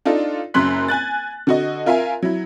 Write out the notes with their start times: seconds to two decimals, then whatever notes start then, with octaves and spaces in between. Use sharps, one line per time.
0.05 D4 D#4 F4 A4
0.54 F#1 F#2 C#3 C6 F#6 B6
0.88 G#5 F#6 A6
1.47 D3 F#4 D#5
1.86 F4 A#4 E5 F5 G#5
2.22 F#3 E4